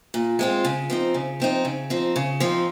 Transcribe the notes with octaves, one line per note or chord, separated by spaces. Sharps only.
A#2
G#3 C4 F4
C#3
F3 C4 D#4
C#3
F3 C4 D#4
C#3
F3 C4 D#4
C#3
F3 C4 D#4